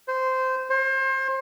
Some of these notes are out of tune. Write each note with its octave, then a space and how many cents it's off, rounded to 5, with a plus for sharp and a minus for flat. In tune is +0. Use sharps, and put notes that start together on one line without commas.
C5 -10
C5 +30